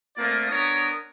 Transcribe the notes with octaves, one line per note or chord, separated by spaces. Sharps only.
A3 A#3 C4 F4 A#4 D5
B3 D4 A#4 C#5 D#6